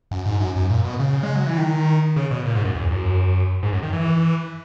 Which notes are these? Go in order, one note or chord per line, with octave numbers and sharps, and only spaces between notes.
F#2
G#2
F#2
F#2
A#2
B2
C#3
G#3
F#3
E3
D#3
C#3
B2
A#2
G#2
F#2
E2
F#2
G#2
F#2
D#3
E3